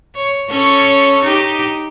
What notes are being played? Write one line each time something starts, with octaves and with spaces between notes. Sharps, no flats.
C#5
C#4 A4 C#5
D#4 G4